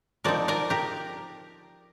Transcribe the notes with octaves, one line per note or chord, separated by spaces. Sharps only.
F3 C4 D#4 A#4 D5
A#4 D5
G4 A#4